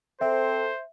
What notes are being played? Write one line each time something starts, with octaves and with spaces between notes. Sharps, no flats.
C4 A4 C5 E5